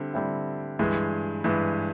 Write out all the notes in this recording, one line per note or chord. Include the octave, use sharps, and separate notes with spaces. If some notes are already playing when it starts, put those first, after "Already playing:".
Already playing: D3 G3 C4 E4
D3 G3 C4 E4
G2 E3 G#3
G2 E3 G#3